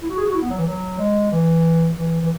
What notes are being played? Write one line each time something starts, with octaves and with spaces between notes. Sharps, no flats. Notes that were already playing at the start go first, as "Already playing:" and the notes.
E4
F#4
G#4
F#4
E4
B3
F#3
E3
F#3
G#3
E3
E3
E3